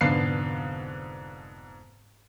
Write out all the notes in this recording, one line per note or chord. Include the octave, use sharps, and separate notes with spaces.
F1 G#2 D3 B3 F5 C7